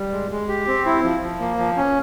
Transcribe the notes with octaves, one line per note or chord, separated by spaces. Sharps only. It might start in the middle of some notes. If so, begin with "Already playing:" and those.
Already playing: G3
G#3
G#3
G4
C4
E4
F3
F3
A#3
F3
C#4